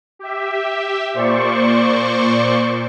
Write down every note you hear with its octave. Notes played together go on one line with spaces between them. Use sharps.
G4 E5
A#2 C5 D5 C#6